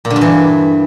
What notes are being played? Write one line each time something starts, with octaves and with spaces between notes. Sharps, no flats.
A#2
D3
G2
E3